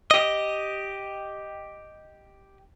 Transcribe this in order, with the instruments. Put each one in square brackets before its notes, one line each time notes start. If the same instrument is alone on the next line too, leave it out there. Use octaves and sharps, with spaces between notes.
[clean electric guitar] G4 D#5